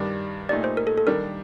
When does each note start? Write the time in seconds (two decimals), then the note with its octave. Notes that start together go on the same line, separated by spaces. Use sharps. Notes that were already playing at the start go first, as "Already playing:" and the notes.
Already playing: G2 D#3 G3 D4
0.49 A#2 A3 D#4 G4 D5
0.64 C5
0.77 A#4
0.87 A4
0.98 A4
1.06 D#3 G3 D4 G4 A#4